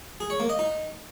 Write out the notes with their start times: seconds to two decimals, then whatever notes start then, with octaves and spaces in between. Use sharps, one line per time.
0.20 G#4
0.30 C#5
0.40 A#3
0.49 D#5
0.59 D#4